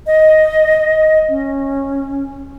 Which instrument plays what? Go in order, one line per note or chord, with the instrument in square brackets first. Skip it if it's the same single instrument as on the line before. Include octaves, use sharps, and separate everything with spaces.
[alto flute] D#5
C#4